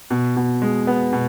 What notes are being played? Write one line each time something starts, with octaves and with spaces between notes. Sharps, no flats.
B2
B2
G#3
B3
B2